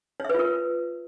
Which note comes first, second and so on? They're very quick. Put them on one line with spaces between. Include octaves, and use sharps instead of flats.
C#5 E5 B4 F4 A#4